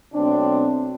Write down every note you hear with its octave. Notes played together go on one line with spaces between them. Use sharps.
B2 F#3 A3 C4 D4